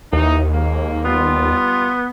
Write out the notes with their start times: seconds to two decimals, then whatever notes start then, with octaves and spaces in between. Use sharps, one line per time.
0.13 D#2 E3 D#4
0.52 G#2 A#3
1.04 G3 B3 F4